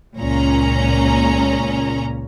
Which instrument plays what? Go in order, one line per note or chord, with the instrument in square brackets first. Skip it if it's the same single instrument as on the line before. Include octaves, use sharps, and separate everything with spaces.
[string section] C#2 A#2 C#4 A#5